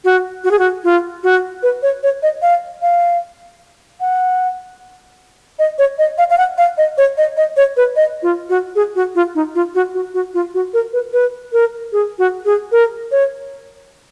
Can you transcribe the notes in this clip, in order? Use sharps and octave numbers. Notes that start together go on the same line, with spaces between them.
F#4
F#4
G#4
F#4
F4
F#4
B4
C#5
C#5
D#5
F5
F5
F#5
D#5
C#5
D#5
F5
F5
F#5
F5
D#5
C#5
D#5
D#5
C#5
B4
D#5
F4
F#4
G#4
F#4
F4
D#4
F4
F#4
F#4
F#4
F4
F#4
A#4
B4
B4
A#4
G#4
F#4
G#4
A#4
C#5